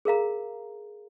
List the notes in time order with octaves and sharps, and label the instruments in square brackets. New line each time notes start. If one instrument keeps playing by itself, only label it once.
[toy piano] G#4 A#4 F5 A#5